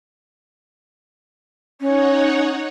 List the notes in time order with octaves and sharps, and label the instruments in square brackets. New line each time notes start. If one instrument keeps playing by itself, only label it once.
[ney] C#4 [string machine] D#4 C#5 F#5